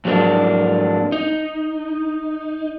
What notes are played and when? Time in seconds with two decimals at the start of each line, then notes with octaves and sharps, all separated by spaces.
0.05 F2 G#2 F#3 A#3 D4 E4
1.12 D#4